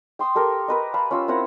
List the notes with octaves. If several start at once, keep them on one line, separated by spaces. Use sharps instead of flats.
G5 C6 D#6 E6
G4 A4 A#4
A#4 B4 D#5
F5 A5 B5
C#4 F4 E6
C4 E4 A#4 F#5